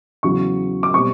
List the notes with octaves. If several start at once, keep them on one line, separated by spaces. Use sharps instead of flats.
E2 C#3 F#3 C#6
D6
B2 G3 C4 C#6